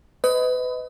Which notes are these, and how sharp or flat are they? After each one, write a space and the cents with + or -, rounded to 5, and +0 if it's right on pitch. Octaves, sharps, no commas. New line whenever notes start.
B4 +30 D#5 +15